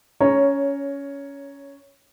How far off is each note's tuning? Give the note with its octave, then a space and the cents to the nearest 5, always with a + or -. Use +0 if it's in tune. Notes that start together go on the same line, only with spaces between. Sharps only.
C#4 +15 C#5 +0 A#5 +0